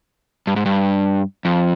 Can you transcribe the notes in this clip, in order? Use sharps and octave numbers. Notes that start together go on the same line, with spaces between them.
G2
G#2
G2
F2